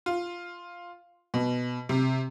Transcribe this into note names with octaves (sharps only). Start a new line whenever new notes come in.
F4
B2
C3